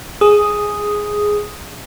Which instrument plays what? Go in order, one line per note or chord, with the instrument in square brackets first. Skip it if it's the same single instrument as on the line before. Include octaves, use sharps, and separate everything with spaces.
[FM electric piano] G#4 D#6